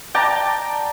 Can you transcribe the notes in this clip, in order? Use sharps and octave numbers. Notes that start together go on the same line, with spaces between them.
D5 G5 A5 A#5